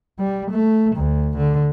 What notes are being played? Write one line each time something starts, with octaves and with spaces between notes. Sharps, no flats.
G3
A3
D2
D3